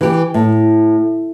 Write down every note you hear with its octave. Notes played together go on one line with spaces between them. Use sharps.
E3 G4
A2